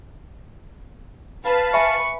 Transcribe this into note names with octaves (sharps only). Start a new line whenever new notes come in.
B4 F5 A5
E5 G#5 B5 C#6